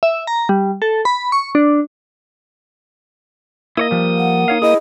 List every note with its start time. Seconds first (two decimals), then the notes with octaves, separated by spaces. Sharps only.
0.03 E5
0.27 A#5
0.49 G3
0.82 A4
1.05 B5
1.32 C#6
1.55 D4
3.77 A#3 E4 C#5 D#5 D#6
3.91 F3 G3
4.17 F#5
4.48 D#4 C#5 F5
4.62 E4 G#4 D#5